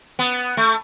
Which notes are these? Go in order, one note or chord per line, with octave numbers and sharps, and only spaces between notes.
B3
A3